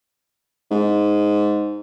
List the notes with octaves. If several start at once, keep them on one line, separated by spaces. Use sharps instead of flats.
G#2